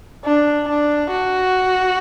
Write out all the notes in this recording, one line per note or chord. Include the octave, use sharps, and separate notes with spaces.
D4
D4
F#4